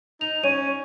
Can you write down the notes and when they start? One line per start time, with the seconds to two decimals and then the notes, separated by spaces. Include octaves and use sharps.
0.21 D#4 F7
0.44 C#4 C#5 D#7